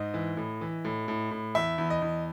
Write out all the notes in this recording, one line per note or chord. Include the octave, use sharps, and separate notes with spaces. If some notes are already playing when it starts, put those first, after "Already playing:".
Already playing: G#2 D#5
E3
A2
E3
A2
A2
A2
E2 E5
E2
D#5
E2